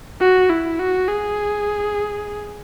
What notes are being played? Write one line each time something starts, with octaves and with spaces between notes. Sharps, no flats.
F#4
E4
F#4
G#4